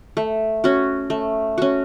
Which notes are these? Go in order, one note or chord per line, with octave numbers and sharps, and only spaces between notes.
A3
C#4 F#4
A3
C#4 F#4